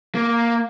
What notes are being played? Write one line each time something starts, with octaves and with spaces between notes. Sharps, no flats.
A#3